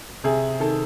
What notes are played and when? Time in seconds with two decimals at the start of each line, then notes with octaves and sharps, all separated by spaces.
0.24 C3 G#4
0.60 D#3 A4